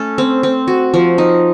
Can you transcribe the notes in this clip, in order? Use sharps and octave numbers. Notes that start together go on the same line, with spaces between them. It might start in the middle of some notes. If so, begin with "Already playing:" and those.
Already playing: A3 C#4 A4
C4
C4
F#4
F3
D#4